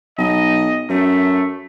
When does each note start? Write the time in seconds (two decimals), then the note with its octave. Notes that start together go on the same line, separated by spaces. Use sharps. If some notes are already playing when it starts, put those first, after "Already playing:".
0.18 B1 D#5
0.90 F#2 A3